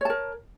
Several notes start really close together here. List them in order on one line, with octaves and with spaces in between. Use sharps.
C#5 A5 A#4